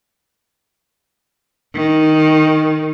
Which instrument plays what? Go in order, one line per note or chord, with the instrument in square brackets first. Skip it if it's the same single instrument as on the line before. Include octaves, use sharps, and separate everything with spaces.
[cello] D#3